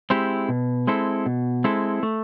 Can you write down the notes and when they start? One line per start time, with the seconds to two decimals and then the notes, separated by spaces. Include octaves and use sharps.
0.10 G#3 C4 E4 G4
0.49 B2
0.87 G#3 C4 E4 A4
1.26 B2
1.64 G#3 C4 E4 A4
2.03 A3